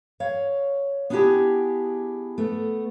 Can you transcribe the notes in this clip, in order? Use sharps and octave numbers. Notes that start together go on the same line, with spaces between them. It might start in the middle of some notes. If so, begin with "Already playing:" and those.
C#5 F5
B3 D4 E4 F4 G4 G#4
A3 B3